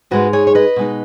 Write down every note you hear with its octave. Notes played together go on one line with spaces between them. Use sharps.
G#2 G#3 D#4 F#4 B4
G#4 C#5
C#5
B4 D#5
B2 G#3 D#4